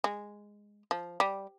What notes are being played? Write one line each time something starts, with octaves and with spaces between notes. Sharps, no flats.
G#3
F3
G3